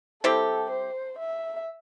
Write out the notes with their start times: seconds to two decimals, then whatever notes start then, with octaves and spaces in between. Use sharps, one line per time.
0.24 G3 C4 E4 G4 A4
0.70 C5
1.18 E5